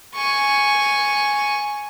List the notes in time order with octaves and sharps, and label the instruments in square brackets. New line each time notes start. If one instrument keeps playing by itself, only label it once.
[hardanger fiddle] G#5 C#6